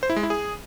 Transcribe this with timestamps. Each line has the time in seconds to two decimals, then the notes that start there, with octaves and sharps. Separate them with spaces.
0.03 C5
0.10 E4
0.16 G#3
0.23 E4
0.30 G#4